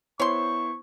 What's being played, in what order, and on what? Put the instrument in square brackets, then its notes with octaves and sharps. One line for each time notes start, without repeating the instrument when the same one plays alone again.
[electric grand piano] B3 E4 C5 [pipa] C#5 C6 [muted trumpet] C#6